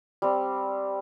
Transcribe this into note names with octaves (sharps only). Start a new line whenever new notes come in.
G3 C4